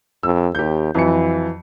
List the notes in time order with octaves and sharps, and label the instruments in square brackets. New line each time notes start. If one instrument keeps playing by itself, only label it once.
[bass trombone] F2 [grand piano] E6
[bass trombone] D#2 [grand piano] G4 G6
[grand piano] F2 F#3 C#7 [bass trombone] E3